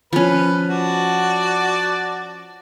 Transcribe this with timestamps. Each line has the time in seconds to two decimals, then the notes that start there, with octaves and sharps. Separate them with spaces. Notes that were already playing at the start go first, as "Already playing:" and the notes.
0.13 F3 C#4 B4
0.70 F#4 D5 A5